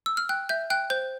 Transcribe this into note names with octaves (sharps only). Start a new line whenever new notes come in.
E6
F6
G5 F#6
E5 G6
G5 F#6
C5 G6